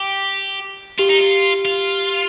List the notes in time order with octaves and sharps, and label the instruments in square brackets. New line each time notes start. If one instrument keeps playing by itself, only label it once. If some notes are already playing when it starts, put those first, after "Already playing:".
Already playing: [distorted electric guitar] G4
[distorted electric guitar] F4 [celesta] G4
[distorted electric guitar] D#4
F4
F4